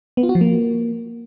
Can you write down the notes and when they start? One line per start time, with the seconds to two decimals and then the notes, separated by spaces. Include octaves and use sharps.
0.17 B3
0.23 F4
0.29 F#4
0.35 F3
0.41 A#3